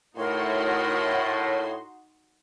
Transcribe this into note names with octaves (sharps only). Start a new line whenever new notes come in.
A2 D#4 F#4 A#4 C#5 C6